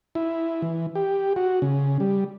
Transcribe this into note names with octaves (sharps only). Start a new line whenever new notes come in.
E4
E3
G4
F#4
C#3
G3